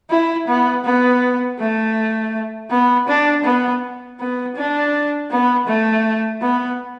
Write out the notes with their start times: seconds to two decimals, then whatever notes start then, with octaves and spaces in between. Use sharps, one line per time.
0.10 E4
0.48 B3
0.85 B3
1.59 A3
2.70 B3
3.08 D4
3.44 B3
4.20 B3
4.56 D4
5.31 B3
5.67 A3
6.42 B3